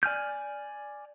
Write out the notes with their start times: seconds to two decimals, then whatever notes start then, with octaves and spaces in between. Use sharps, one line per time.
0.03 D5 G#5 F6 G6